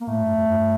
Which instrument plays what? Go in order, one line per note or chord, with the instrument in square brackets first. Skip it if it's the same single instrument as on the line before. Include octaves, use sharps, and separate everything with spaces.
[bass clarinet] A#3
[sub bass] A2 [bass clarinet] A3
[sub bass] G2
F2
G2